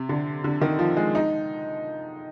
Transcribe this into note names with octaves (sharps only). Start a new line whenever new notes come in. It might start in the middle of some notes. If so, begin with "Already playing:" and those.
Already playing: C3
D3
D3
D#3
F3
G#3
D#4